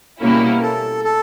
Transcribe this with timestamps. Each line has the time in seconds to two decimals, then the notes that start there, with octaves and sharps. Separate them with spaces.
0.19 B2 G3 A#3 C#4 E4
0.62 A4
1.04 A4